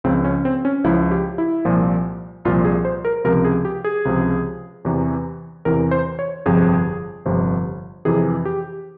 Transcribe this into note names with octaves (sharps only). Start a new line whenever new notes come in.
C#2 C#3 F3 C4
C#4
C4
C#4
C#2 C#3 F3 E4
G4
E4
C2 A#2 F3
C2 A#2 F3 F4
G#4
C5
A#4
C#2 C3 F3 A#4
G#4
G4
G#4
C#2 C3 F3
E2 C3 E3
E2 C3 E3 A#4
C5
C#5
G1 F2 C3 F3 G#4
G1 F2 C3 F3
F2 C3 E3 G#4
G4